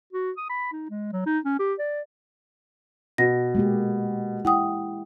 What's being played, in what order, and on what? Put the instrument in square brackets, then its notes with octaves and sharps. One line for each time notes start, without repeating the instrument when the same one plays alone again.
[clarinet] F#4
D#6
B5
D#4
G#3
F#3
D#4
C#4
G4
D5
[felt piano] B2 [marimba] A#6
[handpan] G#3 A#3 G4
[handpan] E4 [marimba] F#5 G5 D#6